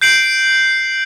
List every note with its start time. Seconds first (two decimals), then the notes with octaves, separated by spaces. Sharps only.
0.01 G6 C7 D7 F#7